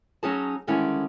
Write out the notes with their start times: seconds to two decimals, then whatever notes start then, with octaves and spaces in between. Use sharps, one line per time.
0.23 F#3 C#4 D#4 G#4 A5
0.67 D3 D#3 G3 G#3 C#4 E4